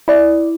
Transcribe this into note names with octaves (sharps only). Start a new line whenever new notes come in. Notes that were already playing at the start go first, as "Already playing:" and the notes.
E4 D5